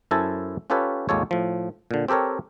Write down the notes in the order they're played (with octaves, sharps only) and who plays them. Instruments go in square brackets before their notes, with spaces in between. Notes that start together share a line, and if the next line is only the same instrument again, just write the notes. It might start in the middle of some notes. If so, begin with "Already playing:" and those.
[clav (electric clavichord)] F#2 E4 A4 C5 G#5 A5
C#4 F4 G4 A4 B4 C#5
G#1 D#2 G#3 F4 A4 C#5
A2 F3
A#2 D3
C4 G4 A4 A#4 C#5